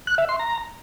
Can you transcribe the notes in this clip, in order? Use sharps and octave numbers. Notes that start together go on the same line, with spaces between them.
F#6
E5
C6
A#5